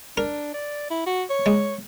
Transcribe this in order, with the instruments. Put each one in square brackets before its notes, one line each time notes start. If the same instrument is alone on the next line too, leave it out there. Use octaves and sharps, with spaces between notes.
[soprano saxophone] D4 [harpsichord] A#4
[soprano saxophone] D5
E4
F#4
C#5
[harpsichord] G#3